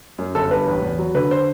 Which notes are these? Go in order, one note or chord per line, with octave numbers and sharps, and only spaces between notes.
F#2
G1 A4
G2 B4
A1
E2
F#3
D3 B4
C5